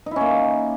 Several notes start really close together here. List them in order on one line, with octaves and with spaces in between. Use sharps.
D#4 E4 C#4 A#3